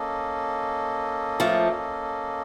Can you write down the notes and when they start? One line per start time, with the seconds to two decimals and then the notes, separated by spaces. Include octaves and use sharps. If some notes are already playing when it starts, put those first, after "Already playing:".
Already playing: A#3 C#4 A4 D#5
1.40 F3 A3